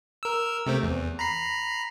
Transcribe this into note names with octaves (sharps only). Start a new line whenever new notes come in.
A#4 E6
C3 A3 C4
E2
A#5 B5 C7